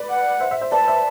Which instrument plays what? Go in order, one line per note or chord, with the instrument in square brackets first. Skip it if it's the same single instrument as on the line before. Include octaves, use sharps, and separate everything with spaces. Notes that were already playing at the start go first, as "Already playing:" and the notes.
Already playing: [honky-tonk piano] B4 D5
[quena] F#5
[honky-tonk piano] C5 E5
C5 E5
C5 E5
[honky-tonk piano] B4 D5 [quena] A5
[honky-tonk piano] C5 E5